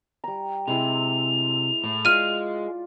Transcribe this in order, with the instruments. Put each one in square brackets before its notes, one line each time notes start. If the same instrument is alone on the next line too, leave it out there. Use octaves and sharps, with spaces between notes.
[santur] G3 A#5
[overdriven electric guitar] C3 [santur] G#3 E4 [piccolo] F7
[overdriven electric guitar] A2 [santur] D6
[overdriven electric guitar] G#3 [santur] F4 D5 [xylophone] F6 D#7